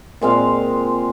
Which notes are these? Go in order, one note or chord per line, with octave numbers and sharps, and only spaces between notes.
A#2 G#3 C4 F5